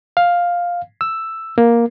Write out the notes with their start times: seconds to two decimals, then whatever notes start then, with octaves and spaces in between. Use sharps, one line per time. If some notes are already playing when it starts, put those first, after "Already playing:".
0.17 F5
1.01 E6
1.58 A#3